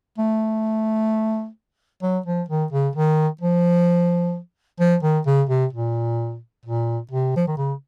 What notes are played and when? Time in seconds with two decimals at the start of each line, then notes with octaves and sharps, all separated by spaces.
0.18 A3
2.02 F#3
2.26 F3
2.48 D#3
2.72 C#3
2.95 D#3
3.41 F3
4.80 F3
5.03 D#3
5.26 C#3
5.49 C3
5.73 A#2
6.65 A#2
7.11 C3
7.36 F3
7.47 D#3
7.57 C#3